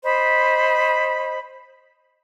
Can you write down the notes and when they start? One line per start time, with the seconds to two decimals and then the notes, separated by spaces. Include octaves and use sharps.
0.03 C5 D#5 B5